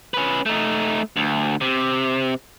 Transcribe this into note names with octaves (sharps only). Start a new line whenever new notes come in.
C#4 B4
A3 D#4
D2
C3